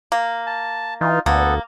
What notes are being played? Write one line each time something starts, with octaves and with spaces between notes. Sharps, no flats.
A#3
A5
E3 D#4 F4
D2 A#3 B3 A4